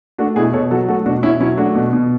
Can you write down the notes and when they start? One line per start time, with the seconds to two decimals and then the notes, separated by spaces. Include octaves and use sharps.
0.18 A3 D4 F#4
0.36 B2 E4 G#4
0.53 B2 A4 C#5
0.71 F#3 F#4 A4
0.88 A3 F#4 A4
1.06 B2 D4 F#4
1.23 B2 C#4 E4
1.40 F#3 C#4 E4
1.57 A3 D4 F#4
1.75 B2
1.93 B2